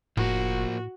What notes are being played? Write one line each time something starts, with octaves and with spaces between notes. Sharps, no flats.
F1 A2 F3 A#3 F#4